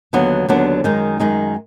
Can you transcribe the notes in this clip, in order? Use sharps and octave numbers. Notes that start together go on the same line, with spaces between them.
D#2 D3 F#3 B3 D4
D#2 D3 F#3 B3 D4
F#2 D#3 G#3 D#4
F#2 D#3 G#3 D#4